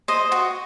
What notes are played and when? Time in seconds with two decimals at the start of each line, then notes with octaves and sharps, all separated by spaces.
0.08 C5 D#5
0.32 F#4